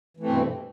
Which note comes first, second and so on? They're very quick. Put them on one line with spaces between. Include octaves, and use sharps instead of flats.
E3 A3 C4 G2 B2